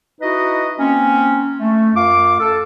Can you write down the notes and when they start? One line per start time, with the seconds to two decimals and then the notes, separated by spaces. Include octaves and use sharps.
0.21 D#4 E4 F#4 B4 D#5
0.79 A#3 C4 C#4
1.60 A3
1.95 F#2 F4 F5 D6
2.40 A4